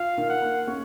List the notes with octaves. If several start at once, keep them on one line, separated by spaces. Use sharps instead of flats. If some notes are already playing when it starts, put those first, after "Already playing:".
Already playing: F4 F5
D#3
F#5
A#3
C#4